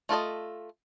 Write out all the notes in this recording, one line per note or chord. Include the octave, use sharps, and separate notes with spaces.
A3 F4 A4 D#5